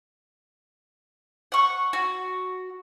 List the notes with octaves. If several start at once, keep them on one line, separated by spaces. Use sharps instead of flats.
F#5 C#6
F#4